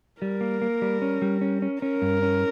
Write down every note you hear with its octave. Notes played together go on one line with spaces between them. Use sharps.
G3 A#4
A#3
A#3
G3
C#4
G3
C#4
C#4
C#4 A#4
G2
C#4